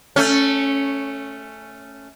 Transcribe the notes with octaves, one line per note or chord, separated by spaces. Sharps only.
A3 C#4